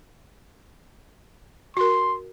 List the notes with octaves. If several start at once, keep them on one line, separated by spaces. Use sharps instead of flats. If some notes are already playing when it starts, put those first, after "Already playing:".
F#4 A#4 C6